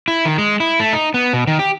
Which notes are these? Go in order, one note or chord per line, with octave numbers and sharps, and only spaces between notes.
E4
D#3
G#3
E4
A3
D#4
B3
B2
D#3
G4